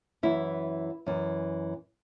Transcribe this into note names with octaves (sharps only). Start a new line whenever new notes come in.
F#2 E3 E4
F#2 E3